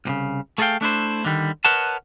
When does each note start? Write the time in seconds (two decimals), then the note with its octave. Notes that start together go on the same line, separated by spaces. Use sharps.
0.05 C2 A#2 C#3
0.58 A3 G#4 A4 C#5 F5 G5
0.81 A3 D4 E4 C5
1.25 D3 D#3 G3
1.65 A#4 B4 C#5 D#5 F#5 A5